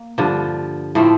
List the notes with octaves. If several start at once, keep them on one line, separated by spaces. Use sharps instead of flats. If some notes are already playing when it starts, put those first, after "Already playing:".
Already playing: A#3
G2 D3 F3
A2 F3 A3 C4